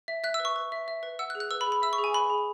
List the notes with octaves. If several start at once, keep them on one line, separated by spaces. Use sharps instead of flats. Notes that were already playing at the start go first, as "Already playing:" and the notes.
E5
E5 F#6
E6
B4
C#6
B4
E5
E5
B4
F#5 E6
F#6
G#4
F#6
B4 E6
B5
G#4
B5
E5 E6
C#6
G#4
G#5
B4 B5
G#4